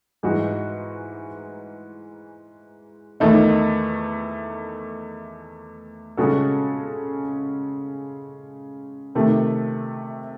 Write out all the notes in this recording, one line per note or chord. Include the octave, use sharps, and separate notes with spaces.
G#2 E3 G#3 D#4 F#4
E2 D#3 A3 D#4
C#3 G#3 C#4 F#4 A4
C3 D#3 A3